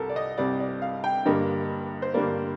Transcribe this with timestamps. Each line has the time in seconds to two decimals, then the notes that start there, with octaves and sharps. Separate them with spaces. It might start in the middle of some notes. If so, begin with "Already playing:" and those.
Already playing: C2 C3 G3 A4 A#4
0.10 D5
0.16 D#5
0.38 C2 C3 G3 D5
0.60 D5
0.82 F5
1.04 G5
1.25 G2 D3 G3 A#3 D#5
2.02 C5
2.14 G2 D3 G3 A#3 D5